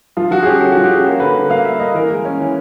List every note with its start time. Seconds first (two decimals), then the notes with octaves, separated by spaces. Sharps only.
0.17 F3 F4
0.31 F3 F#4
0.42 G#4
0.46 C#4 G4
0.61 D3 F#4
0.72 F3 F#4
0.84 G4
0.91 C#4 G#4
1.06 A#3 F#4
1.20 D3 B4
1.35 D3
1.50 A#3 F5
1.65 A#3 E5
1.80 A#3 D#5
1.94 E3 A#4
2.10 G#3
2.25 C#4
2.40 E3